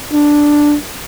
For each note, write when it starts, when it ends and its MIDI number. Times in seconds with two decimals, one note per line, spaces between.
0.13 0.75 62